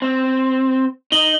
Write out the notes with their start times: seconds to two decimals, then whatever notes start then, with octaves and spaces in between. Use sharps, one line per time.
0.02 C4
1.12 D#4 F#7 G7